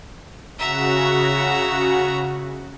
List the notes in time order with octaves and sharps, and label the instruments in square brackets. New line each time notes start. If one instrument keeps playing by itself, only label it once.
[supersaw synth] C#3 F#4 [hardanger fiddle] E5 A#5